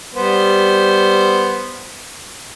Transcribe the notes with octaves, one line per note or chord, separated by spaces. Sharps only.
G3 B3 C5